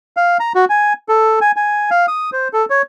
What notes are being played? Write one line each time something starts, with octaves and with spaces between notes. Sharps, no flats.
F5
A#5
F#4
G#5
A4
G#5
G#5
F5
D#6
C5
A4
C#5